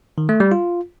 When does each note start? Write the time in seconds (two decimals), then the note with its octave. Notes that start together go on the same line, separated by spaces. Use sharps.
0.18 D#3
0.29 A3
0.40 G3
0.52 F4